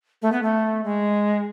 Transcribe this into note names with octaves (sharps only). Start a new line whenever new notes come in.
A3
B3
A3
G#3